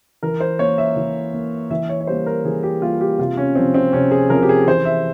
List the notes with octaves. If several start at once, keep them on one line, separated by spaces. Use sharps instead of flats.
E3 A#4
C5
A#3 C#5
E5
E3
A#3
E3 E5
C#5
C#5
G3 A#3 C5
A#4
E3 G#4
G4
G3 A#3 F4
G4
C3 F4
C#4
F3 C4
C4
C3 C#4
G#4
F3 C4 A#4
G4
G#4
E3 C5
E5